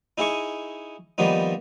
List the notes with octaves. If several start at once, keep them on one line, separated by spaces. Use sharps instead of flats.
D#4 E4 G#4 D#5 C#6
D#3 F3 G3 A#3 B3 D#4